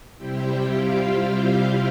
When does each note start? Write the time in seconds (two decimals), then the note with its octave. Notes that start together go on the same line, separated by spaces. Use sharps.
0.17 C3 G3 C4 E4 G4 G5
0.69 F4 F5